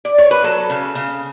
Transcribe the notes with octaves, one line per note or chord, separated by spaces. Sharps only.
D5
C#5
B4
F#3 A4
C#3
C#3